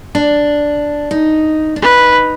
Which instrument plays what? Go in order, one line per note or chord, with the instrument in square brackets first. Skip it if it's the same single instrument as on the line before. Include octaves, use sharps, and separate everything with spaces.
[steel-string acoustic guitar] D4
D#4
D4
[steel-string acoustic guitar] D#4 [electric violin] B4